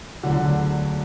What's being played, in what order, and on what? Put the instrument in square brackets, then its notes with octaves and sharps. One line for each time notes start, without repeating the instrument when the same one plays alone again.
[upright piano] E1 D2 D3 F#3 F#4